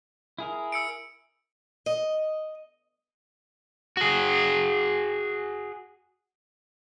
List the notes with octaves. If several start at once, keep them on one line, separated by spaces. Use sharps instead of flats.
E4 G#4 A#4
E6 C#7 D7
D#5
F#4 G#4